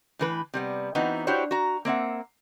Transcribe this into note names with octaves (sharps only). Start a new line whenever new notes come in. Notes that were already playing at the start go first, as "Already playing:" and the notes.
A2 E3 B4
C3 G3 B3
E3 B3 C4 D#4 F#4
D4 E4 F#4 G4 C5 C#5
F#4 A#5
A#3 C4 E5 F#5